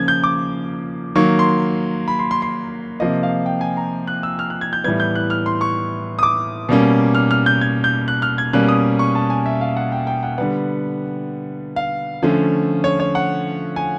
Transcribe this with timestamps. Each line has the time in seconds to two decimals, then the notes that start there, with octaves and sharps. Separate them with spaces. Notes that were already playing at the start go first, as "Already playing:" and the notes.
Already playing: C#3 F3 A#3 C#4 G#6
0.08 G6
0.24 D6
1.15 D#3 F#3 A#3 C#6
1.39 C6
2.08 B5
2.19 C6
2.31 C6
2.42 C6
3.00 C3 F3 A#3 D#5
3.23 F5
3.46 G5
3.61 G#5
3.77 A#5
4.07 F#6
4.23 E6
4.39 F6
4.50 F#6
4.61 G#6
4.73 G6
4.84 A2 E3 G3 B3 G#6
5.00 G6
5.15 F#6
5.30 F6
5.46 C6
5.61 C#6
6.19 D#6
6.23 D6
6.69 B2 G3 A#3 C#4
7.15 F6
7.31 F6
7.46 G6
7.61 G#6
7.84 G6
8.08 F#6
8.22 F6
8.38 G#6
8.53 B2 G3 A#3 C#4 F#6
8.69 D#6
8.99 C#6
9.15 A5
9.30 G#5
9.46 E5
9.61 F5
9.77 F#5
9.92 G5
10.07 G5
10.23 F#5
10.38 D3 G3 B3 F#5
11.76 F5
12.22 D3 F3 A3 C#4
12.84 C#5
13.00 C#5
13.15 F#5
13.76 G#5